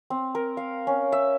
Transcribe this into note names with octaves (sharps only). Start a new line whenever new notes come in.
C4
A#4
F5
C#4
E5